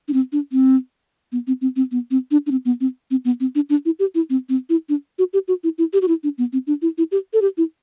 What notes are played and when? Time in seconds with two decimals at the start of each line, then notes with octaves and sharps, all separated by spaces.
0.08 D4
0.13 C4
0.32 D4
0.52 C4
1.32 B3
1.47 C4
1.61 C4
1.76 C4
1.92 B3
2.11 C4
2.31 D4
2.47 D4
2.51 C4
2.65 B3
2.81 C4
3.11 C4
3.25 B3
3.40 C4
3.55 D4
3.70 D4
3.85 E4
3.99 G4
4.15 E4
4.30 C4
4.49 C4
4.69 E4
4.89 D4
5.19 F#4
5.33 G4
5.48 F#4
5.64 E4
5.78 E4
5.93 G4
6.02 F#4
6.08 E4
6.23 D4
6.38 B3
6.53 C4
6.67 D4
6.82 E4
6.98 E4
7.12 G4
7.33 A4
7.42 G4
7.57 E4